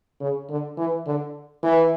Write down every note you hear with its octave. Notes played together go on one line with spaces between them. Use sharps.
C#3
D3
E3
D3
E3